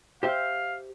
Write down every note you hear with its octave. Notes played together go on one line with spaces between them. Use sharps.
G4 C5 E5 F5